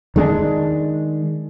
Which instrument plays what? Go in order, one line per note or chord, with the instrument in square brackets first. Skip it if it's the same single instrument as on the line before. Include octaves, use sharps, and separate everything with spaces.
[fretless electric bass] D#3 G#3 A#3 D4